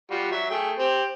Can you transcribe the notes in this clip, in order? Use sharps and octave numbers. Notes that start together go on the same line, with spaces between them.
G3 F4 F#4
F#3 E5
A3 G#4 G5
C4 G4